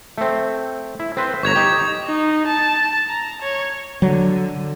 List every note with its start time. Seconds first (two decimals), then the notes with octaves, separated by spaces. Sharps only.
0.18 A3 C4
1.00 E4
1.17 C4 B4 C5
1.43 G1 C#5 A#5 C#6 G#6 F7
1.55 D#4 G4
2.06 D#4
2.47 A5
3.09 A#5
3.42 C#5
4.02 D3 F#3